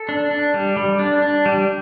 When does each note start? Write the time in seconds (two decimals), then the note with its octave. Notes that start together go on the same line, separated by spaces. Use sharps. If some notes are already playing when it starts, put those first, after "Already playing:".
Already playing: A4
0.09 D4
0.31 D4
0.54 G3
0.77 G3
0.99 D4
1.22 D4
1.46 G3